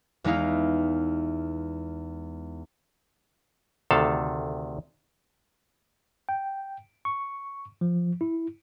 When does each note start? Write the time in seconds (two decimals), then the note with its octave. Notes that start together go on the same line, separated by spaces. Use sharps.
0.24 E2 G#3 B3 D#4 E4 F5
3.91 D2 C3 D#3 A4 F5 A5
6.29 G5
7.05 C#6
7.81 F3
8.21 E4